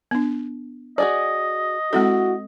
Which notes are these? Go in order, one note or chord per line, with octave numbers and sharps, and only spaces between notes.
B3 D4
F#4 G#4 D5 D#5
G#3 C4 E4 F#4 A4